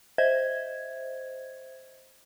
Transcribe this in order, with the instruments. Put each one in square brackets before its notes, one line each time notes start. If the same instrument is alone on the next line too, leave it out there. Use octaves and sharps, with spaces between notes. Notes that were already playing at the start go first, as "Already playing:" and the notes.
[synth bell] C5 D#5 E5 G#6